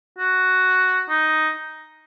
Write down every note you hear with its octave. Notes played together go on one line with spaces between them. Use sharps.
F#4
D#4